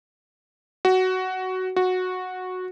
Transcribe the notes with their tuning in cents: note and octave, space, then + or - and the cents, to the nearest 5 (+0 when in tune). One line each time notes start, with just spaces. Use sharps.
F#4 +10
F#4 -10